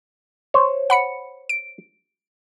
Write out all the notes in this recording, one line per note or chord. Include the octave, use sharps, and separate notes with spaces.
C5 C#5
F#5 B5 C#7
D7